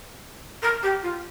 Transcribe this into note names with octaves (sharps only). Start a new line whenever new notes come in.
A#4
G4
F4